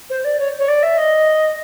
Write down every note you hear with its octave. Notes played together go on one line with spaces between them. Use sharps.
C5
D5
C#5
C#5
D5
E5
D#5